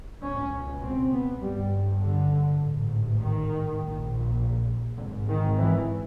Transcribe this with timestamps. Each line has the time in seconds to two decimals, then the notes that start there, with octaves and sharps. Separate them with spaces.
0.22 C#2 B2 C#4
0.82 C4
1.11 B3
1.41 G1 G2 G3
2.01 D3
2.60 A1 G#2
3.20 D#3
3.79 A#1 A#2
4.98 G#1 G#2 D3
5.28 D#3
5.58 E3